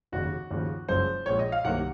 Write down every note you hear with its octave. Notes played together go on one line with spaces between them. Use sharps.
F1 D#2 C#3 F#4
D#2 C#3 F3
F#1 F#2 F3 G#3 C5
A#1 A#2 G#3 C#5
D#5
F5
C2 C3 D#3 F#3 A#3 F#5